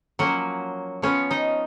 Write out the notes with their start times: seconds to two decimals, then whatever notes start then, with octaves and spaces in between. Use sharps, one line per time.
0.19 F3 F#3 A#3 C#4 F#4
1.02 F3 B3 C#4 C#5
1.31 D#4 D#5